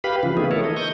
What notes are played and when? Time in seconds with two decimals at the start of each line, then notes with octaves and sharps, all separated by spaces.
0.04 G4 B4 F5 B5
0.23 C#3 E3 F3
0.37 E3 A3 B3 D#4 G#4
0.51 E4 A4 A#4 C#5
0.64 D#5
0.76 C#6 D#6 G6